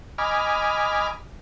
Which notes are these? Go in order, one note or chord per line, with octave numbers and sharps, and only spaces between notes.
D#5 G#5 B5 D6 F6